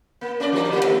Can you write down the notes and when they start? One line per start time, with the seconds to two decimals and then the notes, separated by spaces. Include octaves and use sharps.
0.21 A#3
0.40 C#4 A#4 D5
0.52 E3 G3 D4
0.71 E3 G3 A#3
0.83 A3 D#4